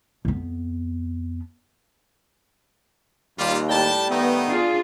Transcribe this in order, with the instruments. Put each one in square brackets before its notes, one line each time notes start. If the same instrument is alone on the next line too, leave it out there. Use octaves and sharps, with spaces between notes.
[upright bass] F2 B3
[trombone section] D#2 [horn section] G3 F4
[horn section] A2 G5 A5 [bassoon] G3
[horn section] D#3 A3 D#4 [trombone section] B3
[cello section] D4 F4 G#4